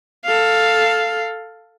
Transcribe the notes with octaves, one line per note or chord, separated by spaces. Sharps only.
A4 F5